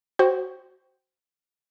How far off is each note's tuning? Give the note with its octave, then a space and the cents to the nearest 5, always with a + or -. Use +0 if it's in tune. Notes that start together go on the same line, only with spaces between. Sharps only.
F#4 +15 C5 +0 G5 +0